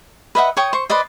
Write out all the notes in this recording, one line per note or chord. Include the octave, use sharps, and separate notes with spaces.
B4 D#5 E5 F#5
C#5 G5 C#6 D#6
C5 C#6
B4 C5 D5 D#5